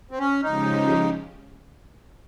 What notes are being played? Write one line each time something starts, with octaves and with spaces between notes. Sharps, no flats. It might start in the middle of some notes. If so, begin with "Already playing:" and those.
C4
C#4
C#3 F3 G#3 C#4 D#4 G4